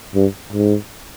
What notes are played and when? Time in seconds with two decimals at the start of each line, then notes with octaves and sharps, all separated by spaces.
0.15 G2
0.53 G#2